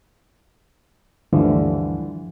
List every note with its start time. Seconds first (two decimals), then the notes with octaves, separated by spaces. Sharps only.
1.32 D2 G2 D3 E3 F3